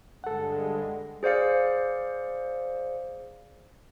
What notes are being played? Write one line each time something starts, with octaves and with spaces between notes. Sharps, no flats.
G2 D3 G#3 A4 F#5
G#4 C5 D5 F5 C#7